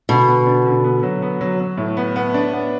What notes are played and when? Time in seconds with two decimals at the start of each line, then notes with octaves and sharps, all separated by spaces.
0.09 B2 D3
0.28 B3
0.47 D4
0.66 D3
0.84 B3
1.03 F#3
1.22 B3
1.41 F#3
1.60 F#3
1.77 A2
1.97 B3
2.16 B3
2.34 D4
2.53 B3